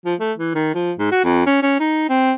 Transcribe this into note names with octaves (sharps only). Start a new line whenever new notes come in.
F3
A3
E3
D#3
F3
G#2
F#4
F2
C#4
C#4
D#4
C4